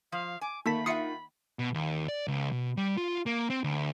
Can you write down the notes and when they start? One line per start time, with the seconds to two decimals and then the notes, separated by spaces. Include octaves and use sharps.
0.12 F3 F5
0.41 G#5 D6
0.66 D#3 A3 A#3 A5 B5 B6
0.86 F4 E5 F#5 D#6 C7 C#7
1.59 B2
1.74 D#2
2.08 D5
2.28 C#2
2.52 B2
2.77 G3
2.98 F4
3.26 A#3
3.50 C4
3.64 D2